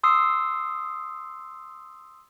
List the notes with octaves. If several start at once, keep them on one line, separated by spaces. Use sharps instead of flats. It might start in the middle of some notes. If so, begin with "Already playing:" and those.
C6 D#6 E6 C7